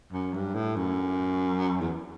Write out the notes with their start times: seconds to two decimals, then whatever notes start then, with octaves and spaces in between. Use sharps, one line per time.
0.12 F#2
0.34 G2
0.55 A2
0.76 F#2
1.81 E2